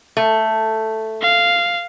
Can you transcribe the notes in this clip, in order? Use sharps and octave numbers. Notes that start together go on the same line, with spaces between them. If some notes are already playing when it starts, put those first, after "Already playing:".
A3
F5